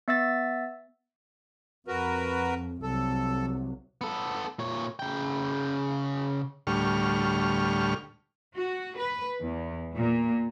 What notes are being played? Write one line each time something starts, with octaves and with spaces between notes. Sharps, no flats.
B3 E5 E6 A6
F2 F#4 A#4 B4
C2 F#3 A4
B3 A4
A#2 C#5
C#3 G5
D2 A2 G3 C#6 F6
F#4
B4
E2
A#2